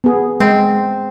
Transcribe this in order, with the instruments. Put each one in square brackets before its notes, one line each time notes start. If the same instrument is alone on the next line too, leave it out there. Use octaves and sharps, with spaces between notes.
[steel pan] B3 G#4
[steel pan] G#3 [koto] C4